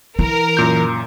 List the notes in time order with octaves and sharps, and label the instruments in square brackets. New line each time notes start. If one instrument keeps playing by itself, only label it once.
[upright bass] E3 [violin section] A#4
[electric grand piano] F#2 A#2 G6